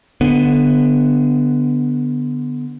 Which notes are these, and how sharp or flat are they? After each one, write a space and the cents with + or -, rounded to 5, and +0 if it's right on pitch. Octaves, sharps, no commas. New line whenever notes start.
D3 +0 B3 +0